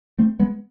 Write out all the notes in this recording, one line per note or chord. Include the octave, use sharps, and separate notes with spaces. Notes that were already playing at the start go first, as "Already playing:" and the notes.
A3 C4
G#3 B3